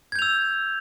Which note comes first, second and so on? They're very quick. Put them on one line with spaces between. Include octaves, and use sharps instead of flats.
G#6 G6 F7 E6